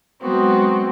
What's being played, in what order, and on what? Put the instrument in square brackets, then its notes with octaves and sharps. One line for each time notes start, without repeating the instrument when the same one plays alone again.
[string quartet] F#3 G#3 B3 C4 F#4